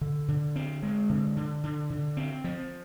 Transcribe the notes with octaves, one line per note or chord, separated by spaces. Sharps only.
D3
D3
C4
G#3
D3
D3
D3
D3
C4
F3